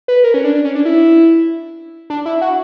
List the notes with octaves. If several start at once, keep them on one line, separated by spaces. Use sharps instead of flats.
B4
A#4
C#4
D4
D4
C#4
D4
E4
D4
E4
F#4